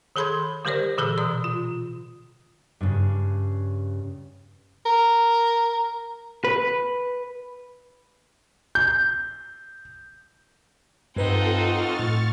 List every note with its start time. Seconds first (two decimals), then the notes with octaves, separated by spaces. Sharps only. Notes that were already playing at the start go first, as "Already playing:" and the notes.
0.16 D#3 G#4 A4 B5 C6 G#6
0.65 D3 G3 G4 A#4 C5 D5
0.98 A#2 D3 E3 G#4 A4 E6
1.18 B2 D5 A#5 D#6
1.44 F4
2.81 G2 C#3
4.86 A#4
6.44 B4
8.75 G6
11.16 G2 C4 D#4 F4 A4 B4 F#5
11.60 C#6 F6 A6
11.99 A2